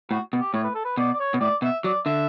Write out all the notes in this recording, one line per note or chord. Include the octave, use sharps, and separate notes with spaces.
A2 F#4
B2
G4
A2 C#5
B4
A4
B4
B2 D5
D5
C#5
B2
A2 D5
B2 E5
F#3 D5
D3 E5